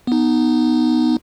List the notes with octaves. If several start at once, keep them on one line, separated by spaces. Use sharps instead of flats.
B3 D#4